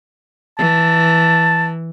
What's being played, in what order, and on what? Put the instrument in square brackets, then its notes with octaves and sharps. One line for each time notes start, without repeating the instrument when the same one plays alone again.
[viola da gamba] E3 [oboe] A5